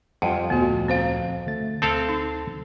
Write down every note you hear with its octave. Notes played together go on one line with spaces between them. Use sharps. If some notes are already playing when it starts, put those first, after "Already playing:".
F2 G3 F4 F#5
D2 A#2 F3 B3 F#4
C4 C5 F5
D3 A3 A6
D2 C4 A4 F5 A5
D#4